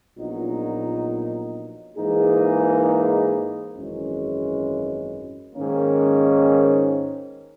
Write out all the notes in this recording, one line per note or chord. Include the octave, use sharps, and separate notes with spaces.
A#1 A#2 F#3 B3 D#4
G#2 E3 A#3 D#4 G#4
G#1 F#2 E3 G#3 C#4
G#2 D#3 A#3 C#4